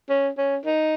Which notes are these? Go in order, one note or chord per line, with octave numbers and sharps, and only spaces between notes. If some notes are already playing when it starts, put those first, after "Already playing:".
C#4
C#4
D#4